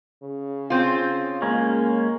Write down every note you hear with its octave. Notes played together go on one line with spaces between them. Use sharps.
C#3
C4 F4
G#3 A#3 C#4